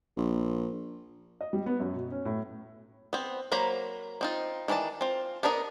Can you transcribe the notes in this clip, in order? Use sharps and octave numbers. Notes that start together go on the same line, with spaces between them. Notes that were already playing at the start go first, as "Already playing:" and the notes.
A#1
D#5
G3
B3
F#2
B2
C#4
A2
B3 C4
F#3 A#3 C5 A#5 B5
C4 D#4 F4
D#3 E3 D4 F4 A5
C4 F4
B3 D4 A#4 D5 D#5